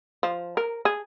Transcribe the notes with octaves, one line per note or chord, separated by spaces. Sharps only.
F3
A#4
G#4